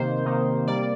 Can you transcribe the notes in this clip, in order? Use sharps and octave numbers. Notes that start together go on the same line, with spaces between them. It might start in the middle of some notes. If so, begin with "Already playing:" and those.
Already playing: C3 D#3 A#3 D#4 C5
C3 D#3 A#3 D#4
C3 G3 A#3 D5